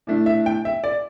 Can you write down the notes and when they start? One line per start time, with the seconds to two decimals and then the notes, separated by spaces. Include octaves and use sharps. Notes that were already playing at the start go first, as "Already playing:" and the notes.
0.07 A2 A3 D4
0.26 E5
0.46 G5
0.65 E5
0.84 D5